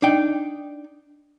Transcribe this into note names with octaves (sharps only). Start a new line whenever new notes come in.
D4 D#4 G5